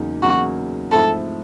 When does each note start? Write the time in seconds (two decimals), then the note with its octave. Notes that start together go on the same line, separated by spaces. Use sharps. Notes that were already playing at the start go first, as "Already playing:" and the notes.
Already playing: E2 C#3 F#3 A#3 D#4
0.22 E2 C#3 F#3 A#3 D#4 F#4
0.92 G#2 F3 A3 C4 E4 A4